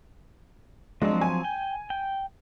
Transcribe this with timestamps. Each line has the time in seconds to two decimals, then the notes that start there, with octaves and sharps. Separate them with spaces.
1.02 F3 F#3 G#3 C4 D4
1.21 G#5
1.44 G5
1.90 G5